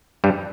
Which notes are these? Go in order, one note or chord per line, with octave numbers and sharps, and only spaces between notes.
G2 G3